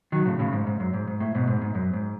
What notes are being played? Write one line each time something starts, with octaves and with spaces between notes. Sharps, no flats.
D#3 F#3
A2 C#3
A2 C#3
G#2
G#2
F#2
G#2
G#2
A2
G#2 B2
G#2
G#2
F#2
G#2